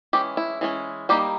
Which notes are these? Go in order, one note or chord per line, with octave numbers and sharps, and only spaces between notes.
E3 G#3 C#4 G4
E4
E3 G#3 C#4
G3 A#3 D#4 G4